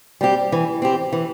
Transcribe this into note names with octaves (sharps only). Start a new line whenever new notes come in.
G3 C4 G4
E3
C4 G4
E3